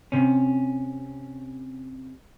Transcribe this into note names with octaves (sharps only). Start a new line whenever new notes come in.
C3 C#4